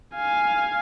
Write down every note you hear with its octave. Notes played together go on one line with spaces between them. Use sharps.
F5 G#5